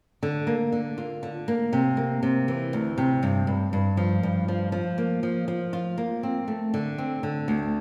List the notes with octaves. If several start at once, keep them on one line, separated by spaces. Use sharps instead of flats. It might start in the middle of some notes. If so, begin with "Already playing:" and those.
D3
A#3
D3
F4
D3
A#3
C3
A#3
C3
E3
D2
C3
G2
G2
G2
F3
G2
F3
F3
A#3
F3
F3
F4
A#3
C4
A3
D3
C4
D3
D2